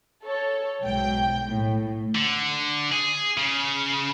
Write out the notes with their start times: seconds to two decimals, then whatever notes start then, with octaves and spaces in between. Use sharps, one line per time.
0.23 A4 C#5
0.83 B1 G#2 F#3 G5 G6
1.47 A2
2.15 D3
2.92 G#4
3.38 C#3